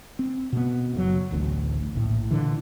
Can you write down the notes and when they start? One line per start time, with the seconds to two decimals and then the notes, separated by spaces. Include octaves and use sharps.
0.19 C4
0.52 B2 B3
0.95 F#1 C3 F#3
1.31 D1 A1 D2
1.94 A#1 A2
2.31 A#2 D3 E3